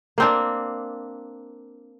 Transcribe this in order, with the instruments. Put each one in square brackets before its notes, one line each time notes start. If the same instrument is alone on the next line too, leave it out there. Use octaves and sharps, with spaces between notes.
[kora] A#3 C4 D4